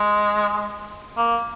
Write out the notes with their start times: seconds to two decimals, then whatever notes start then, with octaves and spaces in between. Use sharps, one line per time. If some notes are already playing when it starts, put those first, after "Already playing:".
Already playing: G#3
1.17 A#3